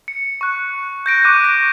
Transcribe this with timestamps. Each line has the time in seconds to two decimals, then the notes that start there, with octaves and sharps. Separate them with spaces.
0.08 C#7
0.41 C#6 F#6
1.06 G6 A#6 D7
1.24 C#6 D6 F#6 D#7
1.45 A#6